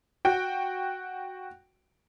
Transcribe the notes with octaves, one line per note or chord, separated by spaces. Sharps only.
F#4 G5